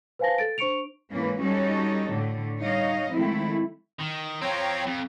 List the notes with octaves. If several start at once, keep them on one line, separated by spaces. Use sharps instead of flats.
B4 C5 F5 G#5 A5 A#6
A4 A6 D7
D4 C5 C#6 C#7 D7 F7
G#2 E3 A#3 C#4 B4
G3 C#4 D#4 F#4 A4 C#5
A2 D3 A3
G3 D#4 C#5 D#5 F5
D#3 F3 G#3 A3 C4 E4
D#3
F3 C4 C#5 G5 A#5
F2